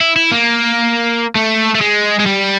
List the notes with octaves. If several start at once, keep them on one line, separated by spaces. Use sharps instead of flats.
E4
E4
A#3
A3
A3
G#3
G#3
G3